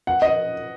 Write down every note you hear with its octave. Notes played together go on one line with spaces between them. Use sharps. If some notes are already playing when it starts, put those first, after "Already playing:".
F#5
D#5